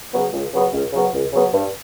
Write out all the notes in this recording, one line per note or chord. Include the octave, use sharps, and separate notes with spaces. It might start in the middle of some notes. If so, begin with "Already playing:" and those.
C#3 F#3 B3
C#2
C#3 F#3 B3
C#2
C#3 F#3 B3
C#2
C#3 F#3 B3
G2